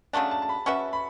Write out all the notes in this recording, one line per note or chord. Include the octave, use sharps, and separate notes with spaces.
C#3 F#3 A3 D4 A5
A5
A5
B5
C#4 F#4 B4 E5 C#6
B5